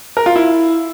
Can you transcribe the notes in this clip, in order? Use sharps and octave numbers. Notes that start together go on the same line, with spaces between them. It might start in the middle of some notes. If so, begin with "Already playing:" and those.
A#4
F4
E4